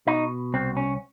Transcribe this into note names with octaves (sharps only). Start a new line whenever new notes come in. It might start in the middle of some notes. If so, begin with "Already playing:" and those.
B2 D#4
C2 C4
C#4